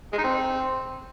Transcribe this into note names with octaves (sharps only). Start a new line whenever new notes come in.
G#3
D#4
C4